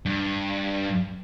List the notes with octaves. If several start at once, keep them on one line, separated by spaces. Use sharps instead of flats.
G2